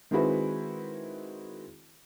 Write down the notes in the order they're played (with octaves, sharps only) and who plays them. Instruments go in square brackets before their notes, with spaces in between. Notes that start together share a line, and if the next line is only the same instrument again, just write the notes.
[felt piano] D#3 G#3 C4 E4 F#4 B4